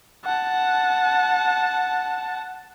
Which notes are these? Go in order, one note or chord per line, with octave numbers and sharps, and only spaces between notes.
F#5 A5